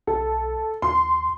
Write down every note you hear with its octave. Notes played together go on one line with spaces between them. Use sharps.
B1 A4
D#2 C6